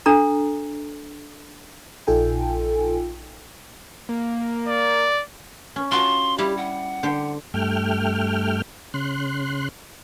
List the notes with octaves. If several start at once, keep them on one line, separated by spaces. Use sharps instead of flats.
D4 A4 A#5
A#1 D#4 F4 A4 G5 G#5
A#3
D5
C#4
F4 F#4 A5 C6
G3 E4 G4
F#5
D3 G4 C5
G2 A3 G5 F6
C#3 C6 F#6